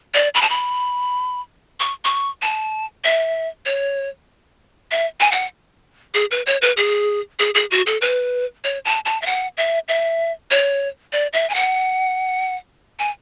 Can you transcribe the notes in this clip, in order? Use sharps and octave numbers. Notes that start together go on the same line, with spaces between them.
D5
B5
A5
B5
C#6
C#6
A5
E5
C#5
E5
G#5
F#5
G#4
B4
C#5
B4
G#4
G#4
G#4
F#4
A4
B4
C#5
A5
A5
E5
F#5
E5
E5
C#5
D5
E5
G#5
F#5
G#5